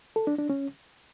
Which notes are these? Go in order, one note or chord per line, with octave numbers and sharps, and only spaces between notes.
A4
D4
D4
C#4